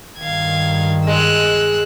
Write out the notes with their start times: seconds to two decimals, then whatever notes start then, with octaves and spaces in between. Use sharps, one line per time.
0.20 G2 D#3 F5 G#6
1.07 G#3 E6 F#6